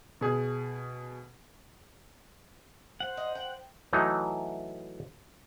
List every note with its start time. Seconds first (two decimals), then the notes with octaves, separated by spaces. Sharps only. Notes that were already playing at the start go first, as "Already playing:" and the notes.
0.21 B2 G#4
3.00 C5 F#5
3.17 D#5
3.35 G5
3.93 E3 F#3 A3 D#4